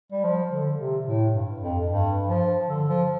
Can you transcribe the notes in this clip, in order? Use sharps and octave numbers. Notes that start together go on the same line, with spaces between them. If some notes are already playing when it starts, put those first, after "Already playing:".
G3
F3
D3
C3
A2
G2
F2
G2
F3
D3
F3